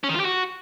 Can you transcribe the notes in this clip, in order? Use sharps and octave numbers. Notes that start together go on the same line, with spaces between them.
C#4
D#3
F4
G4
F#4